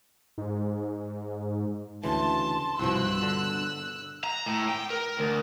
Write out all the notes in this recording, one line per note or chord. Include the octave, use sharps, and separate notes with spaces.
G#2
D2 C#3 E3 A5 C6
C2 G2 B2 F3 E6 F#6
D3
A#5
A2
G5
A#4
D2